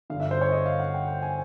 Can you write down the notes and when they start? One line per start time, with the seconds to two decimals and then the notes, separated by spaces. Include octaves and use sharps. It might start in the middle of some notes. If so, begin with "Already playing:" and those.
0.10 G1 G2 D3 F5
0.20 E5
0.31 C5
0.41 C#5
0.52 D#5
0.66 F5
0.79 F#5
0.94 G5
1.08 G5
1.22 G#5